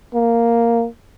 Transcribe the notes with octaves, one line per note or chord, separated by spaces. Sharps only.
A#3